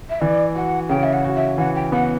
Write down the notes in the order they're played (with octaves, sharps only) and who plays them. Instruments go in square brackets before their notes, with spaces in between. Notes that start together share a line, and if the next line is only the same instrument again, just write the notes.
[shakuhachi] E5
[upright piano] E3 [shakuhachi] D5
[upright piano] F#4 [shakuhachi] F#5
[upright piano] C#3 [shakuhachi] G5
[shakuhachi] E5
F#5
[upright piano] F#4
[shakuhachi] E5
[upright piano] E3 [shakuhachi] F#5
[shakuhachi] G5
[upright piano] B3 [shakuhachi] F#5